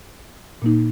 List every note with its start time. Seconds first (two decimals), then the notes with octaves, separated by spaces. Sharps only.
0.62 A#2 A#3 D#4